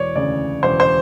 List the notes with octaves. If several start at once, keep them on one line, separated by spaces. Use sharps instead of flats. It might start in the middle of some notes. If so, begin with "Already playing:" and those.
Already playing: E1 C#5 D5
D2 C#3 D5
E1 C5
C5